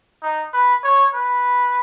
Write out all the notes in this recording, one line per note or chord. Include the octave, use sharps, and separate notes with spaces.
D#4
B4
C#5
B4